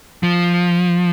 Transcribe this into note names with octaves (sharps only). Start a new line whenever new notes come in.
F3